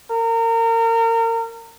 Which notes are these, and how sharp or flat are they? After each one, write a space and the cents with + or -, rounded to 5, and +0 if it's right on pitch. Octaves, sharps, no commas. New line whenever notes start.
A#4 -30